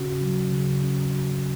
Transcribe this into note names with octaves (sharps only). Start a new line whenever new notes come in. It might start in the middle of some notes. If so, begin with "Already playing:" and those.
Already playing: C#3 C#4 F#4
F#3
C#3
C#4
F#4